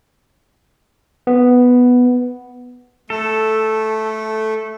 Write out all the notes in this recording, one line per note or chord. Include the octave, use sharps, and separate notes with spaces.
B3
A3 A4